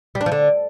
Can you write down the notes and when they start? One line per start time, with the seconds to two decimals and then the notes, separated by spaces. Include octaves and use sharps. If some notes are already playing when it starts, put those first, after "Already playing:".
0.15 G3
0.21 D4
0.26 F3
0.32 D3